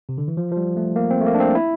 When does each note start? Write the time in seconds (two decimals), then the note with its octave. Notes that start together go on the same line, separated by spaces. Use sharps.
0.09 C3
0.18 D3
0.28 E3
0.37 F3
0.52 F3
0.57 G3
0.77 A3
0.96 A#3
1.11 C4
1.21 A3
1.26 A#3
1.34 D4
1.40 C4
1.55 E4